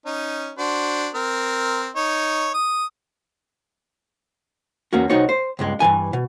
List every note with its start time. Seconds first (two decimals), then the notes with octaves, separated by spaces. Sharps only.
0.06 C#4 D#4
0.58 D4 F#4 C5
1.14 C4 A#4
1.96 D#4 C#5
2.54 D#6
4.93 E2 A#3 C#4 F#4
5.10 C2 D#4 F#4 C#5
5.29 C5
5.59 C#2 G2 G#3
5.80 G2 B2 E3 G#5
6.13 B2